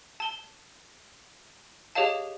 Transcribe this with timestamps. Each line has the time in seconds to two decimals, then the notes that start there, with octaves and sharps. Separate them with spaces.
0.20 A5 G7
1.95 G4 G#4 C#5 D#5 F5 A5